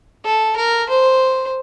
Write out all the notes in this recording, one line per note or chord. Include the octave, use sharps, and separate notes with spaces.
A4
A#4
C5